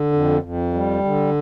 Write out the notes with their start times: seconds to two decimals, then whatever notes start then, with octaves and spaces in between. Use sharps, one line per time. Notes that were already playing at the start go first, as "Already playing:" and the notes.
Already playing: D3
0.12 F2
0.43 F2
0.73 G3
1.04 D3